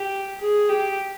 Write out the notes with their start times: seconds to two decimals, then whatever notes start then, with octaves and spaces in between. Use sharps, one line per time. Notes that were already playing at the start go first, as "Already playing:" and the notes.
Already playing: G4
0.41 G#4
0.69 G4